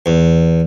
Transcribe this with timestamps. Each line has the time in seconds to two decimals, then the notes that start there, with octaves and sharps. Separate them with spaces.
0.06 E2